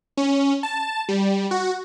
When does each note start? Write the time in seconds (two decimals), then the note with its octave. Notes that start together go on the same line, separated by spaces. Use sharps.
0.17 C#4
0.63 A5
1.09 G3
1.51 F#4